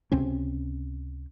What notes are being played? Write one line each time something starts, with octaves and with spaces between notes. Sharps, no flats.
C#2 C3 C4 C#4